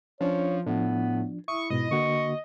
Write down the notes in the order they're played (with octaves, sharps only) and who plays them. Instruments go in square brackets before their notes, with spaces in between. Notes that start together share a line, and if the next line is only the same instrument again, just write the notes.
[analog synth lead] F3 [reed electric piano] C#4 D4 [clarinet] C#5
[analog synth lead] A2 [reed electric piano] F3 D4 [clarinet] B3
[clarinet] E4 [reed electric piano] E5 D#6 [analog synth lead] C#6
[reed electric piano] G#2 B2 [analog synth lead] D#5
[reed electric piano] D3 A#3 F#4 [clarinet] C#6